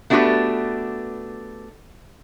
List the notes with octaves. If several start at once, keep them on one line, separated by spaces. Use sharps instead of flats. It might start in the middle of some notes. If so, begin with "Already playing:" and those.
A3 B3 D4 F#4 G4 B4